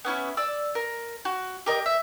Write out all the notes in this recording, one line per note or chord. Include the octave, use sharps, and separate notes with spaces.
B3 C#4 E4
D5 E6
A#4
F#4
G4 A#4 D#5
E5